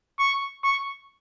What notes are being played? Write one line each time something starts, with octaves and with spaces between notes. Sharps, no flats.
C#6
C#6